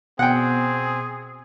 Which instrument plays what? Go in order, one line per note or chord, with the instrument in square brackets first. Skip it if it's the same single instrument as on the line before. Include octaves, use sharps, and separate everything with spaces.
[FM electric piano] B2 [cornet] C4 [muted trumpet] G#4 [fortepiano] F#5 G5